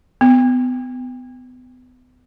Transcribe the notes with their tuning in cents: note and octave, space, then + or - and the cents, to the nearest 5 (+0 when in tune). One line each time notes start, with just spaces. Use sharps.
B3 +30